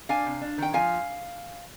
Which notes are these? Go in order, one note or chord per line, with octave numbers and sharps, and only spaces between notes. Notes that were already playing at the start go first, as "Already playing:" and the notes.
D4 F5 G#5
C3
D4
D#3 G5
F3 F5 G#5